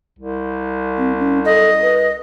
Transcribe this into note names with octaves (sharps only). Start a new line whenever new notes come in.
C2
C4
C#4
A4 D#5
B4